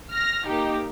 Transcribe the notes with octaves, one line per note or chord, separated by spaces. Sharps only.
F6 A#6
A#3 D#4 G4